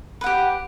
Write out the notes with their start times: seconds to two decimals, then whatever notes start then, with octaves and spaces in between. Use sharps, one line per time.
0.21 B4
0.24 F#5
0.26 G4